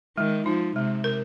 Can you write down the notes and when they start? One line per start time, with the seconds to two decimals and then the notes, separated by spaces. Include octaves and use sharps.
0.17 D#3 G#3
0.46 F3 D#4
0.76 C3 G#3
1.04 A#4